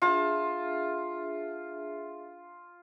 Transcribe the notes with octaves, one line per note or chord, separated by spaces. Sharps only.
D4 F4 G#4 E5 A5